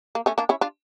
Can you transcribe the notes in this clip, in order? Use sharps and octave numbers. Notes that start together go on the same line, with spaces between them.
A#3
A3 C#4
A#3 D4
C#4 E4
D4 F4